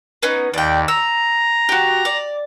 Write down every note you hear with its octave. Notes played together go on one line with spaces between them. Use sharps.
B3 C#4 D#4
D#2 D5 G5
A#5 E6
F#4 G4
D5